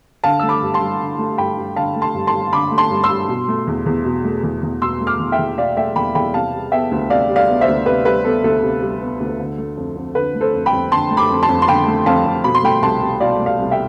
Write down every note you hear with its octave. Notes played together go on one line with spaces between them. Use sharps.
D3 F5 A5
A3 E6
B5 D6
G2
A5 C6
G2
D3
A3
G2 G5 B5
G2
D3 F5 A5
A3
A5 C6
G2
A5 C6
G2
D3 B5 D6
A3
A5 C6
G2
C6 E6
G2
B2
A3
E2
E2
B2
A3
E2
E2
B2 C6 E6
A3
D6 F6
E2
E5 G5
E2
B2 D5 F5
A3 E5 G5
E2 G5 B5
E2 G5 B5
C3 F5 A5
G3
B3 E5 G5
D2
C3 D5 F5
G3
D5 F5
B3
C5 E5
D2
C3 B4
G3 B4
B3 A4
D2 A4
C3
G3
B3
D2
D3
A3
F2
F2
D3 B4
A3
A4 C5
F2
G5 B5
F2
D3 A5 C6
A3
B5 D6
F2
A5 C6
F2
C6
D3 G5 B5
A3
F2 F5 A5
F2
B2 B5
C6
A3 G5 B5
C2 A5 C6
C2
B2 D5 F5
A3
D5 F5
C2
E5 G5